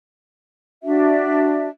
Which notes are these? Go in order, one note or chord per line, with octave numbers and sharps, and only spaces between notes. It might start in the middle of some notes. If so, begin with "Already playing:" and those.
D4 F#4 E5